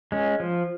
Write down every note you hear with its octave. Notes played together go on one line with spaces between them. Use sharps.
G#3 C#4
F3